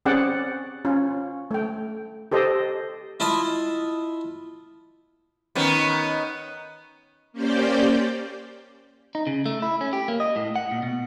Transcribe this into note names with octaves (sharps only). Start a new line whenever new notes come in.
C4 C#4 G#4 D5 F#5 G5
C#4 F4
A3 G5
G4 A4 C5 D#5
E4 F4 D#5 A5 D#6
D#3 B3 C#4
A#3 C#4 G4 C5 D5 G5
D#4
C#3
A3
E4
C#4
G4
A#3
D#5
A2
F#5
A#2
B2